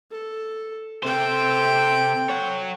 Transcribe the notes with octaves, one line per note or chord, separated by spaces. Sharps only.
A4
C3 A4 C5 G5
C#5 F#5